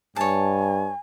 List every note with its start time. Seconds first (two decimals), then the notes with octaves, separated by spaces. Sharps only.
0.16 G2 C#5 G#5 A5